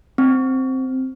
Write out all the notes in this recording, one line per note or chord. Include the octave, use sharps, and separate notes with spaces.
C4